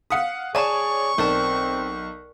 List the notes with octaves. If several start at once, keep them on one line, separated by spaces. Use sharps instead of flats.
F5 F#5 D#6 B6 C#7
G#4 C#5 D5 G#5 A5 C#6 E7
B1 C4 A#4 D5 A5